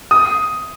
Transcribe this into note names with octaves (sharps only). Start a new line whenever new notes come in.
D#6